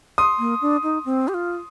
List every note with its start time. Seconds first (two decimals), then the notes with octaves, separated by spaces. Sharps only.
0.18 C6 D#6
0.39 A#3
0.61 D4
0.83 D#4
1.05 C4
1.28 G4
1.34 F4